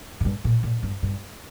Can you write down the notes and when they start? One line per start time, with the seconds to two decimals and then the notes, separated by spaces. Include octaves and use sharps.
0.20 A2
0.25 G2
0.44 A#2
0.63 A#2
0.83 G2
1.02 G2